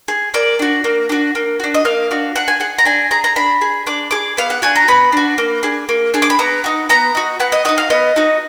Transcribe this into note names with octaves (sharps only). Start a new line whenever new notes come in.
G#4
A#3 D5
D4 F#4
A#3
D4 F#4
A#3
D4 F#4
D#5
A#3 F5
D4 F#4
D4 F#5
G#5
G#4 F#5
A#5
D4 G#5
G#4 A#5
A#5
D4 B5
G#4
D4 D6
G#4 D6
B3 F5
F#5
D4 F#4 G#5
A#5
B3 B5
D4 F#4
A#3
D4 G#4
A#3
D4 G#4
D6
B5
B3 A#5
D#4 F#4
B3 A#5
D#4 F#4
B3 F#5
D#5
D#4 F#4 D#5
F5
B3 D#5
D#4 F#4